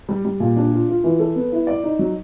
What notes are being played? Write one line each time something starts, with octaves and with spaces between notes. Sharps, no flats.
G3
G3
A#2
D4
F4
F4
E3
A4
B3
E4
D5
D#4
F#3